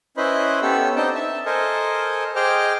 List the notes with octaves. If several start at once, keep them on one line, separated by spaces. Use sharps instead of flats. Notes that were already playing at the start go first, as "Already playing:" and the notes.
C#4 E4 B4 C5 D#5 B5
B3 C#4 G4 A4 E6
C4 D4 D#4 D#5 G5 A5
E5 A5
A4 A#4 C5 D#5 G#5
G#4 C5 D#5 G5 D6 F6